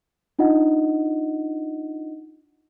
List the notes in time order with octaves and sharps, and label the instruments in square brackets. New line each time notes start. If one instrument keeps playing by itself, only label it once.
[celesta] D4 D#4 F4 D#5 F#5